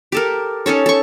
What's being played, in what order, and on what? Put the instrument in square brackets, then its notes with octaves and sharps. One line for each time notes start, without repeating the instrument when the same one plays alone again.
[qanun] G4 A4 A#4
C#4 D#4 A4 C#5
A4 C#6